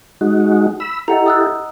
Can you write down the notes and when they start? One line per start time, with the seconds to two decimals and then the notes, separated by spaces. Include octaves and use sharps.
0.21 G#3 D#4 F#4
0.80 B5 E6
1.08 E4 G4 A4 D#5 F#5 A#5
1.26 D#6 E6 F#6